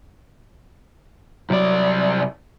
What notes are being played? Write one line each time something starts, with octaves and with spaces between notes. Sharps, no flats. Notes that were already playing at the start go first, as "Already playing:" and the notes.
C2 F#3 D5